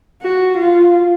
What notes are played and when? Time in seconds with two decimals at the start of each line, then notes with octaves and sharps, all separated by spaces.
0.22 F#4
0.58 F4